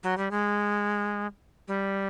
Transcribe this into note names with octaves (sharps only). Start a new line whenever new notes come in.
F#3
G3
G#3
G3